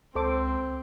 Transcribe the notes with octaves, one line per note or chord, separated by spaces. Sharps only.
C#2 C4 A4 C5 D6